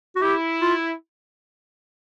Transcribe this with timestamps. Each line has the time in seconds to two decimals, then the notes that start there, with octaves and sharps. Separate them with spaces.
0.16 F#4
0.22 E4 G4
0.61 F4